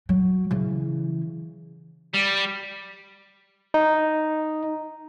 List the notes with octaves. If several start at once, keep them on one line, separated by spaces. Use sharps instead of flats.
F#3
C#3 E3
G3
D#4